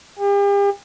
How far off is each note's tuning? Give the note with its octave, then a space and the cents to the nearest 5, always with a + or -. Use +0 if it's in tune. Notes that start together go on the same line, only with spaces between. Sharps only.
G4 +40